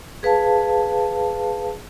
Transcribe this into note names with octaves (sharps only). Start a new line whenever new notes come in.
G#4 B4 F5 A5